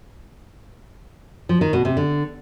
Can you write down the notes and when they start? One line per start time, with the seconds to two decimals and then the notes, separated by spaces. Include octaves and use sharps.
1.49 F3
1.61 D#3
1.73 B2
1.85 C3
1.97 D3